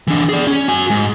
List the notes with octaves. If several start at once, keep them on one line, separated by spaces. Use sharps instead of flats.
E3 D4
G#4 D5
C#4
F#4 G#5
G#2